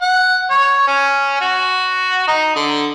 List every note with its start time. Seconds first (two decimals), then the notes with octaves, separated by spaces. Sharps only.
0.02 F#5
0.50 C#5
0.87 C#4
1.41 F#4
2.28 D#4
2.56 D3